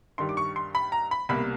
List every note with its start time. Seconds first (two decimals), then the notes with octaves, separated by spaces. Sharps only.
0.18 G2 D#3 G3 C6
0.29 D6
0.37 C#6
0.56 C6
0.75 B5
0.92 A#5
1.11 B5
1.29 C2 B2 G3 A#3 B5